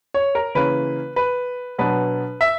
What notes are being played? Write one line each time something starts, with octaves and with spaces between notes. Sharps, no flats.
C#5
A#4
C#3 E3 A#3 C#4 B4
B4
B2 F#3 B3 D4 B4
E5